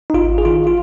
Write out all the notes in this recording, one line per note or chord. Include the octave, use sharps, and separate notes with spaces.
D#4
G#1 F4
G#4
D#3 F4
F4